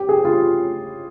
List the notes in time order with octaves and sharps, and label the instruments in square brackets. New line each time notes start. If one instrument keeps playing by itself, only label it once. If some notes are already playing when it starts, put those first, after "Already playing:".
Already playing: [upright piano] G4
G#4
G4
F4